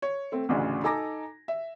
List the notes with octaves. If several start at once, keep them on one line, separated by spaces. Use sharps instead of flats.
C#5
A3 C4
A1 D2 C#3 D4
D#4 A4 G#5 A#5 D6 A#6
E5